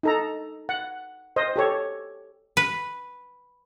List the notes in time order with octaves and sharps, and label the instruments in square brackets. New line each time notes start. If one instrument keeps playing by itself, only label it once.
[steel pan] D#4 A4 A#5
F#5
C5 D#5
G4 A4 C#5
[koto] B4